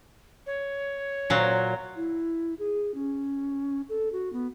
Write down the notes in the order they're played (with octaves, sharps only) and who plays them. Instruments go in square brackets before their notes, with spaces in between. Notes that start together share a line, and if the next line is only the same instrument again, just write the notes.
[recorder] C#5
[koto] A#2 F#3
[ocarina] E4
G#4
C#4
A4
F#4
B3